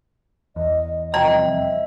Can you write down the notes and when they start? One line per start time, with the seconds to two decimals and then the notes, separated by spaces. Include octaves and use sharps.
0.56 E2 D#5
1.14 C2 F2 D#5 G5 A#5
1.46 E5